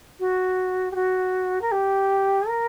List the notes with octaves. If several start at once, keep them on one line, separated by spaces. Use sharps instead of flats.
F#4
G4
F#4
A#4
G4
A#4